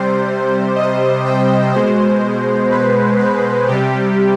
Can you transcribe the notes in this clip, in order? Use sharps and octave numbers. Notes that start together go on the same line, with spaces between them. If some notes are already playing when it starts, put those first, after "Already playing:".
Already playing: C3 G3 C5
D#5
G5
B2 G#3 C5
B4
B4
C3 G3 G4